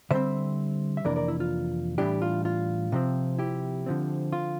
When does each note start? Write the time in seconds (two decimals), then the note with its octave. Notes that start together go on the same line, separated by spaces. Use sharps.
0.11 D3 G3 C4 C5 E5
0.97 E5
1.05 F2 C3 E3 A#3 D4 A#4 D5
1.16 A#4 D5
1.28 E4
1.40 F4
1.98 A2 E3 G3 D4 E4 G4
2.22 F4
2.45 F4
2.92 C3 F3 C4
3.39 E4 G4
3.86 D3 F3 C4
4.33 F4